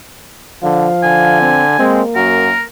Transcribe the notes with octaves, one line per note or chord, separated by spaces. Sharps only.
D3 F3 F5
D3 G#5
C4
G#3 A#3 C4
F#2 F#4 A#4